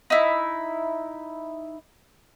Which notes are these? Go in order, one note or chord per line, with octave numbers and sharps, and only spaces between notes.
D#4 E4